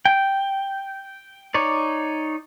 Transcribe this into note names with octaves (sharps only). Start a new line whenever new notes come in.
G5
D#4 C#5 D5